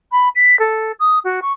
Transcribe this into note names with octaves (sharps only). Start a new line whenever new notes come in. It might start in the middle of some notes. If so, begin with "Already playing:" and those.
B5
B6
A4
D#6
F#4
C#6